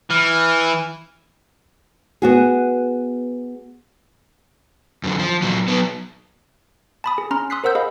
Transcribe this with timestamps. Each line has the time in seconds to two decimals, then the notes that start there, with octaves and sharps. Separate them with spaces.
0.10 E3 F6
2.22 B3 F#4 G#4
5.04 F#2 D3
5.19 F3
5.42 A#2 F#3
5.68 F#3 B3
7.04 A5 B5 D#6
7.18 G#4
7.31 C#4 A#5 C6 F6
7.50 C6 D#6 E6 F#6 B6 C7
7.64 A#4 C5 F#5 E6 G6
7.75 G#4 D#5 F5 B5